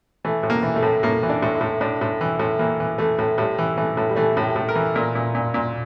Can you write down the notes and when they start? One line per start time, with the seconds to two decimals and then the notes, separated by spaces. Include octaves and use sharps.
0.25 E3 A3
0.43 A2
0.50 A#3
0.63 E3
0.76 A3
0.83 A2
1.03 A2 A#3
1.23 E3
1.29 D4
1.42 A2
1.55 E4
1.61 A2
1.81 A2 D4
2.01 A2
2.21 E3
2.39 A2
2.59 E3 A#3
2.80 E3
2.98 E3 A3
3.19 A2
3.38 A2 G3
3.58 E3
3.77 E3 A3
3.97 A2
4.09 G3
4.16 E3 A3
4.37 A2
4.43 G4
4.56 A2
4.69 A#4
4.75 E3
4.95 A#2 A#4
5.15 A#2
5.35 A#2
5.54 A#2